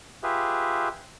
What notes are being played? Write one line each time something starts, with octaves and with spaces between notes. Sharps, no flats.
F4 G4 G#4 B4 E5